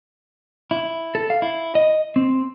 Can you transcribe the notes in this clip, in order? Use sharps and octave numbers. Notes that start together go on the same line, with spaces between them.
E4
A4
F5
E4
D#5
C4